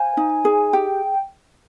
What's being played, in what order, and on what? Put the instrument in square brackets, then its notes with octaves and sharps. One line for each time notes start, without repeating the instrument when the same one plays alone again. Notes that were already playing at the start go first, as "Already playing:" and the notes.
Already playing: [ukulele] C5 F5 [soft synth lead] G#5
[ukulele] D#4
G#4
[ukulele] G4 [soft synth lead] G5